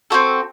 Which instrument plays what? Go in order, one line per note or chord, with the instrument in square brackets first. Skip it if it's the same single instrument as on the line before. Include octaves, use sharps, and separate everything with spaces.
[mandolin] C4 F#4 A4